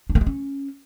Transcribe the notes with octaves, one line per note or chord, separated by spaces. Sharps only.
D4
A#3
G#3
C#4